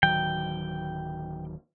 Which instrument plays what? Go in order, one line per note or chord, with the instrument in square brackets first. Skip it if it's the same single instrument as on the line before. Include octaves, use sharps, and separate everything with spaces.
[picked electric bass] D1 D#3 F#3 [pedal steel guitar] G5